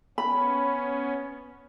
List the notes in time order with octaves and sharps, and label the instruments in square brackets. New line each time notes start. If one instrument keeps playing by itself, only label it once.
[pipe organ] B3 C#4 [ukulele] B5